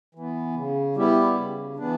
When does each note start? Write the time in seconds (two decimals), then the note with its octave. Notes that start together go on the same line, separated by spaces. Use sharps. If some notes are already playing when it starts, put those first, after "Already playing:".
0.15 E3 B3
0.55 C#3
0.95 G3 B3 E4 G4
1.35 C#3
1.76 E3 B3 D4